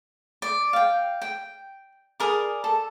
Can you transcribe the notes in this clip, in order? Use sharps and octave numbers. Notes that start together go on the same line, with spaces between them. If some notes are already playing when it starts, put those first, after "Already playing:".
D5
F5 G5
G5
G#4 A#4 D5
A4